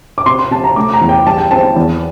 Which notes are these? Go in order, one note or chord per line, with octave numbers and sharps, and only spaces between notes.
D6
C3 C6
C6
C3 A5
A#5
A3 D6
A#5
E2
G5
G3 A5
G5
C4 A5
E2